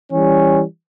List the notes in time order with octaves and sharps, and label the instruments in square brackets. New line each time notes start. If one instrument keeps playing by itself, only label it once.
[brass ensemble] E3 G3 C#4